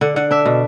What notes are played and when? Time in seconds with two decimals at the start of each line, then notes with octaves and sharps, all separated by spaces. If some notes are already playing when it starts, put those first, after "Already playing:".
0.01 D3 F#5
0.16 D3 F#5
0.31 D4 E5
0.45 B2